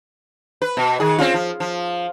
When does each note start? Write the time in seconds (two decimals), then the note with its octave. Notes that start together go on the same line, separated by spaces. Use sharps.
0.62 B4
0.77 B2
1.00 D#3 G#4
1.18 C4 C#4 F4
1.34 F3
1.60 F3